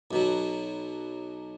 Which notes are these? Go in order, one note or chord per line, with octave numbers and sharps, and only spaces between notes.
B1 B2 F#3